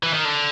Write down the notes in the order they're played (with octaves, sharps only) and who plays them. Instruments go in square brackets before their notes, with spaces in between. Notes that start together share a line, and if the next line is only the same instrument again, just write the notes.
[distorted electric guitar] E3
D#3
D3